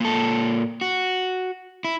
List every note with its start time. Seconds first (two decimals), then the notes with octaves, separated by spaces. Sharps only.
0.01 A#2 A4
0.81 F#4
1.84 E4